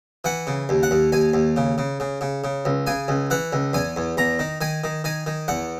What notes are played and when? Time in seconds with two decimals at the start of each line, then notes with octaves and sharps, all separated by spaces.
0.24 E3 F#5
0.47 C#3
0.69 D#2
0.83 F#5
0.91 D#2
1.12 D#2 G#5
1.34 D#2
1.57 C#3
1.78 C#3
2.00 C#3
2.21 C#3
2.44 C#3
2.65 C#2
2.87 C#3 G#5
3.08 C#2
3.30 E3 F#5
3.53 C#2
3.73 E2 G#5
3.96 E2
4.17 E2 A#5
4.39 D#3
4.61 D#3 G#5
4.84 D#3
5.04 D#3 G#5
5.26 D#3
5.48 E2 F#5